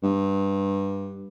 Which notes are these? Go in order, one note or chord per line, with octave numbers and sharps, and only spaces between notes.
G2